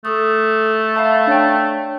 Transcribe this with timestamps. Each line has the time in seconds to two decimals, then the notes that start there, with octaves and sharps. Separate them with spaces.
0.05 A3 A4 D#6
0.96 E5 F5 A5 B5
1.27 D4 C#5 G5